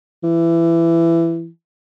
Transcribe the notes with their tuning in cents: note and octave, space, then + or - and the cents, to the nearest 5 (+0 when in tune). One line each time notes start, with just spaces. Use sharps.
E3 +20